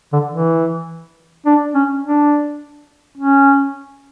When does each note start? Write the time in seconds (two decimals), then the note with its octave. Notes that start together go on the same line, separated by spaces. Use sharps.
0.13 D3
0.31 E3
1.46 D4
1.75 C#4
2.03 D4
3.18 C#4